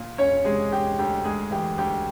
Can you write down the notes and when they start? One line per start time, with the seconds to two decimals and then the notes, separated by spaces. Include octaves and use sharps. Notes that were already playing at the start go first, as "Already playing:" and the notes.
Already playing: A#2
0.18 E1 C#4 C#5
0.45 C3 G#3 G#4
0.71 E1 G4
0.99 D2 G4
1.24 D2 G#3 G#4
1.51 E3 G4
1.78 D2 G4